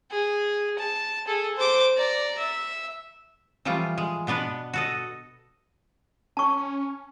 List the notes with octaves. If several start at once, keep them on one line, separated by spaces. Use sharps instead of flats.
G#4
A5
G#4 A4
C5 D6
D5 A#5
E5
E3 F3 G3 A3 F4
G#3
B2 B3 D4 B4 F#5
F#4 A4 D#5
C#4 A5 C#6